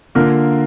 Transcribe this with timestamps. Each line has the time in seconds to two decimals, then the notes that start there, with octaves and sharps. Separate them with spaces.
0.15 D3 A#3 F4 A#4